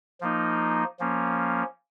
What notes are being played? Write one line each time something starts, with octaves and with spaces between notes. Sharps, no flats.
F3 A#3 D#4
F3 A#3 C#4